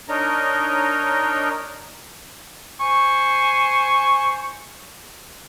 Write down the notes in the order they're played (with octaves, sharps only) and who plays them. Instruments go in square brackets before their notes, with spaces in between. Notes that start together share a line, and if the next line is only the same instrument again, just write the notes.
[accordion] D4 D#4 A#4 C#5 D#5 A#5
[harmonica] C5 G#5 C#6